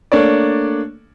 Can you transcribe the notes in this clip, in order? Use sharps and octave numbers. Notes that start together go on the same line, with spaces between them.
A3 A#3 D4 C#5 D5